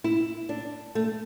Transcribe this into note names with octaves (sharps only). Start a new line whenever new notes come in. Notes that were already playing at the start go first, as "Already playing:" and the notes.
E4
D4
A3